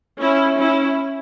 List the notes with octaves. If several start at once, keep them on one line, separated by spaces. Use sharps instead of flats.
C#4 E4
C#4 E4